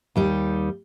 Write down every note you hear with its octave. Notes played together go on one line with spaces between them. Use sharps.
D#2 G3 D#4